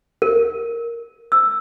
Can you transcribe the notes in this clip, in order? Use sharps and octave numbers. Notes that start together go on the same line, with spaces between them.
A#4
E6